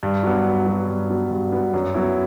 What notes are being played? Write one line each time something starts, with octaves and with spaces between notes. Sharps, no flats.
G2
F#3 B3
G2
F#3 B3
G2
F#3 B3
G2
F#3 B3
F#2
F#3 B3 E4